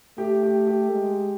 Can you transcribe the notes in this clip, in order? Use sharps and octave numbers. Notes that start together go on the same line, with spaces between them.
A3 G4
G4
G4
G#3